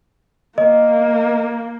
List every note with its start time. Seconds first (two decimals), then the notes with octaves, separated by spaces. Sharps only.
0.58 A#3 D#5